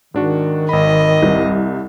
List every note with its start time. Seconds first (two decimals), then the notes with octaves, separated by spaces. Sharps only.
0.14 G#2 D#3 D4 F#4
0.69 G#1 D#5 B5
1.22 C2